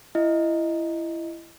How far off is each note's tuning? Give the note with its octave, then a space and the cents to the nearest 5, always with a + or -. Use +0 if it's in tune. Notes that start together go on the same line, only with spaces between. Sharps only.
E4 +25 D#5 +0